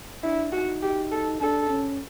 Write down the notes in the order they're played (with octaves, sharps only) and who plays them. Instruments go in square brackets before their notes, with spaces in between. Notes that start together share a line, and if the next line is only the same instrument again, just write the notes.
[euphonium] D4 [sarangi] E4
[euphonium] D#4 [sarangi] F#4
[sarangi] G4
A4
[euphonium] D4 [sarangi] A4
[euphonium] C#4